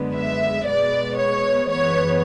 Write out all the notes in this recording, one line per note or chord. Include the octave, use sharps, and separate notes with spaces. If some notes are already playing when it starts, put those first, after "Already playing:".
Already playing: F#2 D3 G#3 B3
E5
B2 G#3 B3 D5
C#5
F#2 E3 G#3 B3 C#5